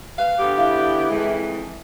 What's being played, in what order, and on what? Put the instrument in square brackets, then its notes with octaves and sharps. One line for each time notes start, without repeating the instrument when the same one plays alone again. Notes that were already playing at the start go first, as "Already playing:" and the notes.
[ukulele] B4 C#5 B5 [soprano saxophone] F5
[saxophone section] D3 B3 G4 [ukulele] F4 A4 C#5
[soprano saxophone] E4 [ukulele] A4 D5 F5
[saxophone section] F2 E3 G#3